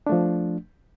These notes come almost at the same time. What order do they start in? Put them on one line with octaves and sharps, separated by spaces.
D4 A3 F3